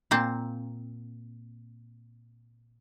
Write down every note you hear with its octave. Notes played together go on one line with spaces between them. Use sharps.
A#2 A#3 C4